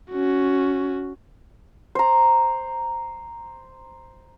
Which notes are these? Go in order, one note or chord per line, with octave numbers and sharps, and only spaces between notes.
C#4 F#4
C5 A#5